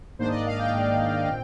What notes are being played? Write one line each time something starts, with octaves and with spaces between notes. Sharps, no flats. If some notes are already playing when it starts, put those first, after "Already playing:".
G#2 D#3 A#3 D4 C5
D#5
D5
F5
G5
G#2 D#3 A#3 D4
A#2 C4